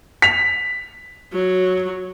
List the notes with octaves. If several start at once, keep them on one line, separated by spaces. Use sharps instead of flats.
B6 F7
F#3